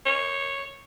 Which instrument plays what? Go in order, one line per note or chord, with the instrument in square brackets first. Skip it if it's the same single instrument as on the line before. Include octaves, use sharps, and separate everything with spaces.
[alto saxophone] C#5